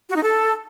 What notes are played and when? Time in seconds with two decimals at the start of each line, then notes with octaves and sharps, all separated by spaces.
0.09 F#4
0.16 D#4
0.22 A4